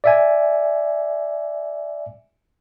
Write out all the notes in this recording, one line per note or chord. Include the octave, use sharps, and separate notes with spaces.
D5 E5 G#5